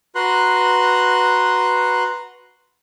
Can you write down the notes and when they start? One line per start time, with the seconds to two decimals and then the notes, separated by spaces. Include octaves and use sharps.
0.15 F#4 B4 A#5 C6 F#6